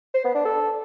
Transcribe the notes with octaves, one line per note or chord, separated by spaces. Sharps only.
C5
B3
D4
A4